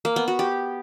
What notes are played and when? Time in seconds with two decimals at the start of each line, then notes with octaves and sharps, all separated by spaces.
0.05 A#3
0.16 B3
0.28 F#4
0.39 G4